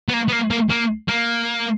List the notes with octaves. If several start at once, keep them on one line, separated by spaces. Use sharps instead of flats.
B3
A#3
B3
A#3
A#3
A#3
A#3